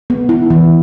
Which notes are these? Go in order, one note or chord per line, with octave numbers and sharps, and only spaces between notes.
B3
E4
E3